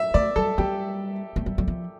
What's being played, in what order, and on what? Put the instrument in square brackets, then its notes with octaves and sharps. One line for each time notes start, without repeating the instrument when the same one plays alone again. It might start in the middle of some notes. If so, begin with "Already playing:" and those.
Already playing: [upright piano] E5
[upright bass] A3 [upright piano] D5
[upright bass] G3 [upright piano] A4
[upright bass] G3 [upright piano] G4
[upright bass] A3
G3
G3
F3